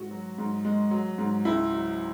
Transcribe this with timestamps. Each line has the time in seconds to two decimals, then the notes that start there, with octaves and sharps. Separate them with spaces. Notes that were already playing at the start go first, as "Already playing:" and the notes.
Already playing: G#2 F#4
0.11 F#3
0.38 G#2
0.65 G#3
0.91 F#3
1.18 G#2
1.45 C#2 E4
1.72 F#3